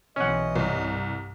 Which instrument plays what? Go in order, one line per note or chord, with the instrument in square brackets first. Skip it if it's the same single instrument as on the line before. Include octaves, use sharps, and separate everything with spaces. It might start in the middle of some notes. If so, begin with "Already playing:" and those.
[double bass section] B1 C3 E3 [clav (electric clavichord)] C#4 F#5 [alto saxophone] D#5
[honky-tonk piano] C2 [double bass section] G2